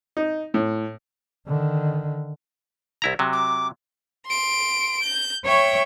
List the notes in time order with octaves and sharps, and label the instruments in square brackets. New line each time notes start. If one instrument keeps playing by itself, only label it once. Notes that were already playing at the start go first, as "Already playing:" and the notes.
[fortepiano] D#4
A2
[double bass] D3 D#3
[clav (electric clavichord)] C2 E4 A#5
C3 F#3
[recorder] D6
[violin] C6 D7
G6
[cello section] C#5 [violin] E5 G5